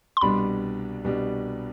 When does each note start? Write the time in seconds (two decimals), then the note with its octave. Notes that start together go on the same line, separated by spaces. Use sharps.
0.17 C6
0.21 C2 B2 G3 D4 B5
1.04 C2 B2 G3 D4